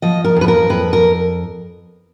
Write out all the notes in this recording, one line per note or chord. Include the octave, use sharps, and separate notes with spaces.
F3 D#5
A#4
F2 B4
A#4
F2 B4
A#4